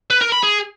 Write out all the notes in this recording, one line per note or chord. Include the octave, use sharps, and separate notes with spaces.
B4
A#4
B5
G#4